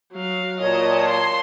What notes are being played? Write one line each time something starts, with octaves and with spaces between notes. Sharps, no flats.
F#3 F5
A#2 C#5 D#5 A5
C6